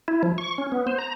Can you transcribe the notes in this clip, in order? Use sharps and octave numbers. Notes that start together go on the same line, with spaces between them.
E4
F3
C#6
C#4
B3
C5
A#5